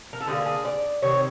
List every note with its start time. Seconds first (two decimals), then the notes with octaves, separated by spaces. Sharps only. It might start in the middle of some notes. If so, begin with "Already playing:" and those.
0.13 A#4
0.21 A4
0.27 D3 G3 G#4
0.32 A#3
0.46 G#4
0.65 D5
1.02 C3 D#3 C#5